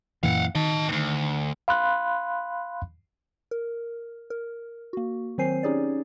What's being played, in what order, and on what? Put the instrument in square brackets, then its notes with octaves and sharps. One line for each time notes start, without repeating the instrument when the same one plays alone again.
[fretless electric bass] F#2 A#2 E3 [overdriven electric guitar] F5 F#5
[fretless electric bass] D#3 [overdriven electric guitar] D#5 A5
[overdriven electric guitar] D2 G2
[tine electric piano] F5 B5 C6 F#6
[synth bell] A#4
A#4
A#3 F#4
D#3 F#3 C4 C5 G#5 C7
C#4 D#4 G4 G#4 C#5 D5